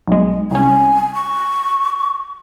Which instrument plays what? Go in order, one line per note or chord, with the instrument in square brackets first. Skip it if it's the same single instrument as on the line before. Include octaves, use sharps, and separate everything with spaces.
[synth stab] B1 G#3
[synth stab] C2 C#4 [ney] G#5
[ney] C#6